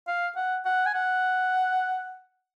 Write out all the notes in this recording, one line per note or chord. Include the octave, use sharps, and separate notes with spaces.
F5
F#5
F#5
G#5
F#5